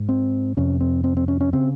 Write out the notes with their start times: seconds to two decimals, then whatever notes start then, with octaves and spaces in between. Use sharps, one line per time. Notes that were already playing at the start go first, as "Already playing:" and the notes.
Already playing: G#2
0.09 C4
0.57 F2 C3 C#4
0.80 C4
1.04 C4
1.17 C4
1.28 C#4
1.41 C#4
1.53 C#3 C4